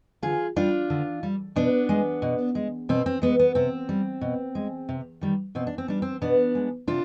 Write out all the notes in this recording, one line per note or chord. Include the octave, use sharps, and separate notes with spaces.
D3 F4 G#4
G3 D4 F4
D3
G3
B2 B3 D4
G#3
B2
G#3
B2 C4
C4
G#3 B3
B3
C3 C4
G3
B2
G#3
C3
D#3 G3
B2 C4
D4
C4
G3 D4
C4
B2 B3 D4
G#3
C3 D4 F4